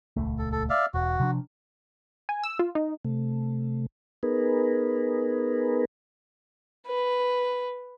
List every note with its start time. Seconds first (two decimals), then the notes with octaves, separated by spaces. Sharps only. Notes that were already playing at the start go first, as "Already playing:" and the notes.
0.16 D#1 C#2 A3
0.38 A4
0.52 A4
0.70 D5 E5 F5
0.94 E1 F#4
1.20 C3 F3 D4
2.29 G#5
2.43 E6
2.59 F4
2.75 D#4
3.05 C3 A3
4.23 B3 D#4 G#4 A#4 B4
6.87 B4